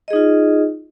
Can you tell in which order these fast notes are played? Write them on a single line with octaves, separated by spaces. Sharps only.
D#5 G#4 D#4 F4